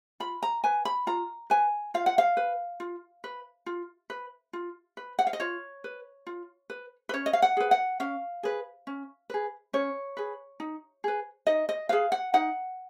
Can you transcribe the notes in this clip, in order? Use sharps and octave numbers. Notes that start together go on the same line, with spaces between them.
F4 B5
A#5
B4 G#5
B5
F4 A#5
B4 G#5
F4 F5
F#5
F5
B4
F4
B4
F4
B4
F4
B4
F#5
F5
D#5
F4 C#5
B4
F4
B4
B4
C#4 C#5
D#5
F5
F#5
G#4 B4
F#5
C#4 F5
G#4 B4
C#4
G#4 B4
C#4 C#5
G#4 B4
D#4
G#4 B4
D#4 D#5
D#5
G#4 B4 F5
F#5
D#4 F#5